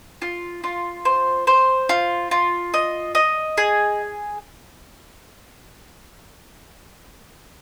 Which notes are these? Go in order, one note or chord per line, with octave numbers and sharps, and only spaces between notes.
F4
F4
C5
C5
F4
F4
D#5
D#5
G#4